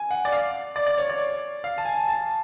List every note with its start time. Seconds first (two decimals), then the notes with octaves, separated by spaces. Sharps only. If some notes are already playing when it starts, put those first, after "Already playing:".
Already playing: G#5
0.11 F#5
0.25 D5
0.32 F5
0.76 D5
0.87 D5
0.98 C#5
1.09 D5
1.64 F5
1.78 A5
1.85 G#5
2.08 A5